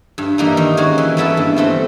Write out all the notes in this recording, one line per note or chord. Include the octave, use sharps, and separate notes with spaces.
G2
E3 G3 A#3 D#4
D#3
G#3 C#4 F#4
E3
G3 B3 E4 A4
G2
E3 A3 C4 E4